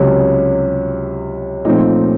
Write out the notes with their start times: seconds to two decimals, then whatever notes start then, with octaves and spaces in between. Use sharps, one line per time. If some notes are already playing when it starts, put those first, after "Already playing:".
Already playing: C#2 C3 F#3 C#4
1.65 A#2 F3 A3 C4 D#4